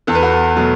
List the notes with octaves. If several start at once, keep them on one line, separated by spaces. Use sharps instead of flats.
E2 A4
B4
F#4 A4
B2 F#3 A3